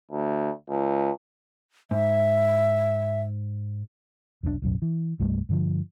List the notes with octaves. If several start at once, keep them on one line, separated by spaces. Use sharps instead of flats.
D2
C#2
G#2 E5
E1 B1 C#3 D4
D1 B1 F#2
E3
C2 G2 G3 A3
G2 D3 F3